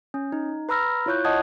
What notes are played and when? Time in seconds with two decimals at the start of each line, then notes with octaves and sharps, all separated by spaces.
0.14 C#4
0.32 D#4
0.69 B4 A#5 B5 E6 F6 A#6
1.06 E4 F4 C#5 C#6 F#6 G6
1.24 C#5 D#5 F#5 A5 D#6 G#6